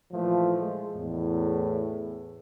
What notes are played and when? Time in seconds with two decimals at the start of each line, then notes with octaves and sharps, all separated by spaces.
0.12 A#2 E3 F3 A3
0.59 G#3
0.95 E2 A2